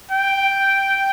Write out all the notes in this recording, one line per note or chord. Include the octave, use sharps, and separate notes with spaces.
G5